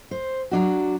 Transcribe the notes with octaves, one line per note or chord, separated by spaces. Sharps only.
C5
F#3 D4 F#4